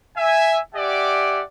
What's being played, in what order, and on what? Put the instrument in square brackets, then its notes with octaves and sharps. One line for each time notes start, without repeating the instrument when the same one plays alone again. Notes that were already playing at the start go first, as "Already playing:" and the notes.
[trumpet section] E5 G#5
G4 D5 E5 F#5 G#5 D6